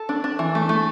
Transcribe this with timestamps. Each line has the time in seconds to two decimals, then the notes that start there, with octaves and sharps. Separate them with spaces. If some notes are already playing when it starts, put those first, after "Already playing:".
Already playing: A4
0.09 D4
0.24 D4
0.39 E3
0.55 A3
0.69 A3